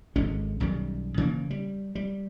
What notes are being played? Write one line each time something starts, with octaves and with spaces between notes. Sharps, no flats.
G#1 D3 G#3 C#4
B1 F#2 D#3 G3
C#3 E3 A#3
G3
G3